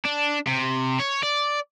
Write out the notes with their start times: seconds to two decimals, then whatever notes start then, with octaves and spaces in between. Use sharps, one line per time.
0.05 D4
0.47 C3
0.99 C#5
1.23 D5